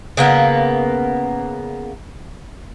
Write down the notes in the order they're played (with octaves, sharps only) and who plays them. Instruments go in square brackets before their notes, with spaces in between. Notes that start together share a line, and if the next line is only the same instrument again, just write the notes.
[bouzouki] C#3 A#3 B3